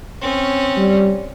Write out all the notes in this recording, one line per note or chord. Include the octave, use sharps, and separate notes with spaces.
C4 C#4
G3